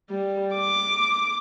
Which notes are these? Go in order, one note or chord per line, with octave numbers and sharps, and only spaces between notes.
G3
D6